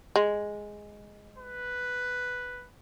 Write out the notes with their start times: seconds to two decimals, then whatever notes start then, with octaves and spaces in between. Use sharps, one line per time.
0.16 G#3
1.38 B4